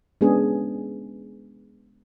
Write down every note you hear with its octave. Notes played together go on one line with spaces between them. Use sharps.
G#3 B3 C#4 D4 G#4